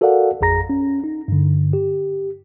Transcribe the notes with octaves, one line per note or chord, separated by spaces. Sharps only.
F#4 A4 A#4 D5 F5 F#5
A1 F2 G#4 A#5 A#6
C#4
D#4
G2 D3
G4